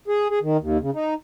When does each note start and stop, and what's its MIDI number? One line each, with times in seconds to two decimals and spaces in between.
0.08 0.28 68
0.29 0.39 68
0.42 0.57 51
0.60 0.78 39
0.81 0.90 49
0.94 1.14 63